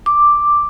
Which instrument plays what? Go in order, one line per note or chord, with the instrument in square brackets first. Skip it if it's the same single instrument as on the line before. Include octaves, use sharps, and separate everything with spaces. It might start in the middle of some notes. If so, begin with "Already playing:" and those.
[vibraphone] D6